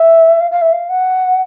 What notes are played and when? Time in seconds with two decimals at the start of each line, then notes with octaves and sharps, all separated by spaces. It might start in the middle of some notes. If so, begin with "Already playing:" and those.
Already playing: E5
0.41 F5
0.52 F5
0.62 E5
0.73 F5
0.90 F#5